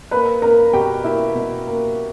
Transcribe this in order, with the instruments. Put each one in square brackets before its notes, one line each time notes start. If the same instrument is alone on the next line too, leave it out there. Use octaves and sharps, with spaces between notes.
[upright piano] A#3 B4 B5
A#3 A#4 A#5
B2 G4 G5
A#3 E4 E5
B2
A#3